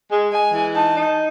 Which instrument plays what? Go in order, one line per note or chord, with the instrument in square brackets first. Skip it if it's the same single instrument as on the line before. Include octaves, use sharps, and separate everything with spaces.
[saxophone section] G#3
[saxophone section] G#3 [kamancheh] G#5
[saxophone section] E3
[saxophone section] D#4 [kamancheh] A5
[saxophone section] D#4